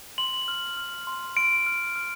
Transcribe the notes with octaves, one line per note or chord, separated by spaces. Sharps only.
C6 F#7
F6
F6
C6
C6 D7
F6
F6